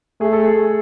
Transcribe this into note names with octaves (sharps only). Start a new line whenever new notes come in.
A3 G#4
A4
G#4